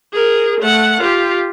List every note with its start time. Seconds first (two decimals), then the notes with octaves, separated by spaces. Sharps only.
0.13 G#4 A#4
0.61 A3 F#5
1.01 F4 G4